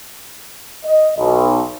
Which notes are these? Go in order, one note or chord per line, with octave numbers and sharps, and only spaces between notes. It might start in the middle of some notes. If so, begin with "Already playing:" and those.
D#5
B1